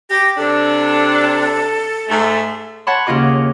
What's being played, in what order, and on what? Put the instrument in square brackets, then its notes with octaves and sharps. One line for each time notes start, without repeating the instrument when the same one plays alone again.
[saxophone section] G4 [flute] A#6
[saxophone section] C3 D4 [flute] A4
[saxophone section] G#2 A3
[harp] C#5 F#5 A5 B5 C6
D#2 C#3 C#4 F4 D#5 D6